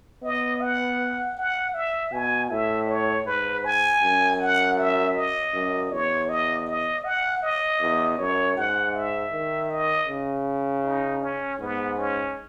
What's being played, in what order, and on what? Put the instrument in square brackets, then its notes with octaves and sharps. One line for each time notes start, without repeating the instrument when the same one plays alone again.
[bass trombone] B3 [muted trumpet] D#5
[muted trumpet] F#5
F#5
E5
[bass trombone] B2 [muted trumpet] G#5
[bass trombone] A2 [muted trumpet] E5
[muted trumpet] C#5
[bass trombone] G#2 [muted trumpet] B4
[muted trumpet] G#5
[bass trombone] F#2
[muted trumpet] F#5
E5
D#5
[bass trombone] F#2
[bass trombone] E2 [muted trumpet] C#5
[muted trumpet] D#5
D#5
F#5
D#5
[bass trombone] E2
[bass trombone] F#2 [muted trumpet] C#5
[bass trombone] G#2 [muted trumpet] F#5
[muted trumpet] E5
[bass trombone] D#3
[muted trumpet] D#5
[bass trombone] C#3
[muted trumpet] D#4
C#4
[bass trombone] G#2 [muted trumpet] B3
[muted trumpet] C#4